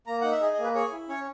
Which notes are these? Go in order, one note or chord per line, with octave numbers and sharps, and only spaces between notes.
A#3 A#5
D#4 F#5
E5
G#4 D#5
D#5
A#3
B4
G#4 C#5
E4
C#4 C#5